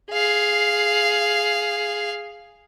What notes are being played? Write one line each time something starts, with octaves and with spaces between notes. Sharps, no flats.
G#4 F5